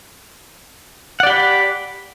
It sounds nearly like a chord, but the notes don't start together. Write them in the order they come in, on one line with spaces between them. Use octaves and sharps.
F#5 D5 G4 B5